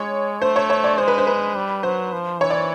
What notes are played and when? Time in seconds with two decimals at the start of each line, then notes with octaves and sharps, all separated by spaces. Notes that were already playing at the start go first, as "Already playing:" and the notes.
Already playing: G#3 C#5
0.41 A3 C5
0.56 C#5
0.70 C#5
0.84 D5
0.98 G#3 C5
1.08 B4
1.18 C5
1.27 B4
1.56 G3
1.83 F#3 C5
2.13 F3
2.40 E3 C#5
2.50 D5